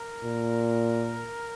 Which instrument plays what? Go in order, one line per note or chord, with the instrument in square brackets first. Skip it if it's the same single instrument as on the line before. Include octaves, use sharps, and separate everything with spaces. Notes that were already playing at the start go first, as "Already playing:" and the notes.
Already playing: [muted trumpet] A#4
[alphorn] A#2